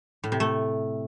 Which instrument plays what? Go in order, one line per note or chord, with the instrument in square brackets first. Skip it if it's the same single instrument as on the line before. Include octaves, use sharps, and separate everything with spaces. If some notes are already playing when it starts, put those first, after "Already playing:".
[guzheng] A2
C3
A3